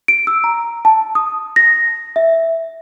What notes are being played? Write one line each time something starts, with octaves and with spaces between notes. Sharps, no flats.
D7
E6
A#5
A5
D#6
A#6
E5